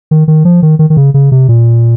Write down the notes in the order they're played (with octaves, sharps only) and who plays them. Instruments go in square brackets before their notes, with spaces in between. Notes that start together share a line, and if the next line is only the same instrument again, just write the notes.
[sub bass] D#3
D#3
F3
D#3
D#3
D#3
C#3
C#3
C3
A#2